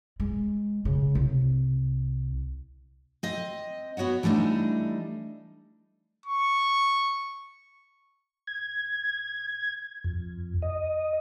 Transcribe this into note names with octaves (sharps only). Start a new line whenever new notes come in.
G#3
C#3
C2
C4 D#5
B3 F#4 C#5 F#5
E3 G3 A3 D4 D#4
C#6
G#6
F2
D#5